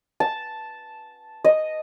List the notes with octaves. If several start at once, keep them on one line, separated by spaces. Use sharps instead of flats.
A5
D#5